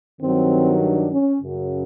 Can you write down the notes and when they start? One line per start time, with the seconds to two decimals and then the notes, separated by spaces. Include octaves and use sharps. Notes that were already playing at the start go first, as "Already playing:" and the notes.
0.19 G2 D#3 F#3 C4
0.81 D4
1.10 C#4
1.41 F#2 C#3 F#3